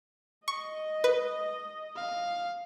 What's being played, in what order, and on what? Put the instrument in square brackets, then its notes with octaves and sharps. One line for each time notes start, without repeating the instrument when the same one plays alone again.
[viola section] D#5 [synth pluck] C#6
[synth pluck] B4
[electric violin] F5